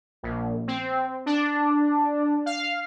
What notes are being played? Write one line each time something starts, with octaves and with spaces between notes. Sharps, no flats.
A#1
C4
D4
F5